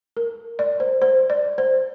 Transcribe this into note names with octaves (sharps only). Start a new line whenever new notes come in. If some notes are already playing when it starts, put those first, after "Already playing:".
A#4
D5
C5
C5
D5
C5